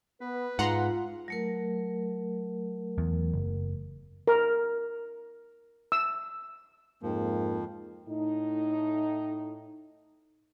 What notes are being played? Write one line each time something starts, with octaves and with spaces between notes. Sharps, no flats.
B3 B4
G#2 F4 F#5 A#5 C6
F#3 A3 A#4
E2
F#1
A#4
E6
F2 G#2 F3 A#3
A2 D#4